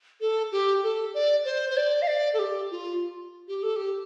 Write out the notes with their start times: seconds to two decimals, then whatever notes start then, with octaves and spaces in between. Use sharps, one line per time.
0.21 A4
0.52 G4
0.83 A4
1.14 D5
1.45 C5
1.70 C5
1.77 D5
2.02 F5
2.07 D5
2.34 A4
2.39 G4
2.71 F4
3.48 G4
3.63 A4
3.76 G4